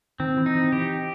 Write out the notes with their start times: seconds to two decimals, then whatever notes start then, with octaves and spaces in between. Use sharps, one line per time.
0.20 D#3 C4
0.37 E3
0.46 D#4
0.55 E3
0.72 E3 G4